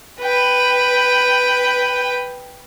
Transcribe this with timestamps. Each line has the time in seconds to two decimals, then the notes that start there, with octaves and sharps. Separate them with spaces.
0.21 B4 G5